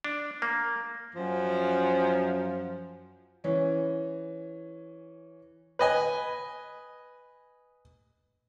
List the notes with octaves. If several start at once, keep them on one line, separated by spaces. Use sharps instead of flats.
D4
A#3
F#2 F3
E3 C#4
B4 D#5 G#5